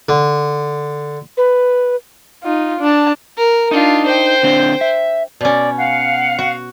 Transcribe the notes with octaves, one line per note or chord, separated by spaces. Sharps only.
D3
B4
D#4 F4
D4 A5
A#4
D4 D#4 F4
C5 G5
D3 C4 D4
E5
B2 C#4 D5
F5 F#5
F#4